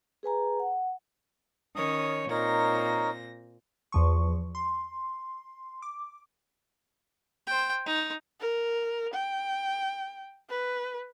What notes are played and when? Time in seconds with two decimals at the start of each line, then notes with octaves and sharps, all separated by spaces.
0.23 G#4 B4 G#5 A#5
0.60 F#5
1.76 D#3 C#4 C#5 D#6
2.30 A#2 C4 D#4 A#4 C#5 A#6
3.92 E2 F3 C#6
4.55 C6
5.82 D6
7.47 C5 G5
7.86 D#4
8.41 A#4
9.14 G5
10.50 B4